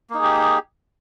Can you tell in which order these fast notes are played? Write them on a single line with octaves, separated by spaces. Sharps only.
A#3 D#4 G#4 G4